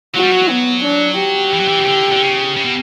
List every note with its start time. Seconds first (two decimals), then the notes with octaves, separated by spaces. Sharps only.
0.15 F#3 F#4
0.23 G3
0.29 F#3
0.49 B3
0.84 D4
1.19 G4
1.53 E3
1.60 F#3
1.68 E3
1.80 C#3
1.87 D3
2.12 D3
2.22 C#3
2.57 C#3
2.65 B2